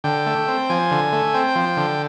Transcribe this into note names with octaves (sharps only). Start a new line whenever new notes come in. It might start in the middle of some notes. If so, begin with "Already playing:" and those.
D3 G5
A3
C4
F3 G#5
D3
A3
C4 G5
F3
D3